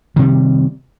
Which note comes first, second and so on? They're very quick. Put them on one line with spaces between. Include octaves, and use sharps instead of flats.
D#3 C3 G3